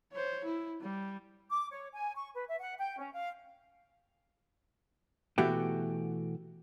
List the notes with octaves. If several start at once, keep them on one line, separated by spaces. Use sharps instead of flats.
C5 C#5
E4
G3
D6
C#5
G#5
C#6
B4
E5
F#5
G5
C#4
F5
B2 E3 A3 F#4 G4